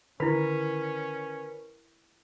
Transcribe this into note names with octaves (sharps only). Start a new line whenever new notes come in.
D3 D#3 C#4 E4 A#4 B4 B5 B6